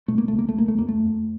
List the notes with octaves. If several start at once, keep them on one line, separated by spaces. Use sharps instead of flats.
B2 A3
A#3
C#2 A3
A#3
A3
C#2 A#3
A3
F2 A#3
A3
F2